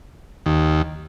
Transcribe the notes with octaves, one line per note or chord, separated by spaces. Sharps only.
D#2